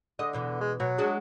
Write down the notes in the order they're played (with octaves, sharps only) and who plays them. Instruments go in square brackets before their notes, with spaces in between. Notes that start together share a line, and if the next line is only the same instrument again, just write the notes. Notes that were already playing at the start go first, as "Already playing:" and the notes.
[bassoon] D3 [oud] D#5
[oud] E2 B2 E3
[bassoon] G#3
[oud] B2 [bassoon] F#3
[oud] G#3 D4 F#4